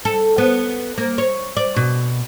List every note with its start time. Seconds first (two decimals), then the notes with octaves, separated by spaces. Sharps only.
0.05 A4
0.38 B3
0.98 A#3
1.18 C#5
1.57 D5
1.76 B2